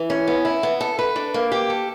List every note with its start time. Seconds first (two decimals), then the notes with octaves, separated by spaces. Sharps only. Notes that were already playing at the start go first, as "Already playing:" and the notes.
Already playing: E3
0.10 C#4
0.27 B3
0.45 E4
0.63 B3
0.81 A4
0.99 B4
1.16 D4
1.34 A#3
1.52 G4
1.70 A4